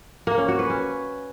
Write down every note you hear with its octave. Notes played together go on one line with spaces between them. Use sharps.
A#3
C#4
F#4
B4
C#4